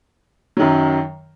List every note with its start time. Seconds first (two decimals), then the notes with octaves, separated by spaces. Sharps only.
0.57 F#2 D#3 F#3